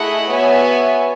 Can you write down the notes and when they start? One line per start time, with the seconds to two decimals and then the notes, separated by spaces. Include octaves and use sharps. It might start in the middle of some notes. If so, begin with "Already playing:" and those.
Already playing: A3 E4 G#4 D#5 F#5
0.29 B3 F#4 C#5 E5 G#5